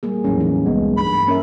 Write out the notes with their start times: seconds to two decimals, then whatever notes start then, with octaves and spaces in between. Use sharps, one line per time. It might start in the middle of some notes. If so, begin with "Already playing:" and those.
0.03 G3 A#3 G#4
0.24 E2 A2 E3 F#3 C#4
0.40 D#4
0.66 C2 G#3 B3
0.97 G2 B5
1.28 A#3 C#4 A#4 E5